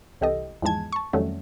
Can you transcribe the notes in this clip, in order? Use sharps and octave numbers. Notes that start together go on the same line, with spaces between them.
C2 E3 G4 A4 D#5
E2 G#2 F3 G#3 A5 G#6
A5 C#6
F2 D#3 F#3 G3 A3 C#4